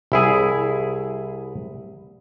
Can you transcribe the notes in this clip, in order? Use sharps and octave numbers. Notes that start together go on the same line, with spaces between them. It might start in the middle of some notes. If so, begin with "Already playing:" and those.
C2 E4 G#4